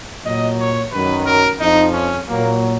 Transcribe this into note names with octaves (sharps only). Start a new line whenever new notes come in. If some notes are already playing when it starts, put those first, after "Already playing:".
A#2 F#3 D#5
C#5
F#2 D#3 F#3 B4
A#4
F2 F3 D#4
C#4
A#2 F#3 A#3